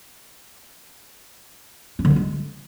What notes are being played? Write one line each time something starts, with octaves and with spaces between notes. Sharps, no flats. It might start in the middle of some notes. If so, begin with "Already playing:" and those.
C#4
D3
A#3
G#3